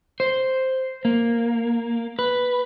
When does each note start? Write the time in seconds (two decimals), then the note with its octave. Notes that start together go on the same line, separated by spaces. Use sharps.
0.20 C5
1.05 A#3
2.19 B4